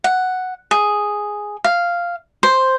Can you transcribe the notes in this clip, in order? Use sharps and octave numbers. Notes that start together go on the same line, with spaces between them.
F#5
G#4
F5
C5